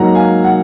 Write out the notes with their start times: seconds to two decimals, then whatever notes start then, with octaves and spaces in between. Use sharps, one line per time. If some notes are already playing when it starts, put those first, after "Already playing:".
Already playing: G#2 F#3 A#3 F#5 A#5
0.15 F5 G#5
0.44 F#5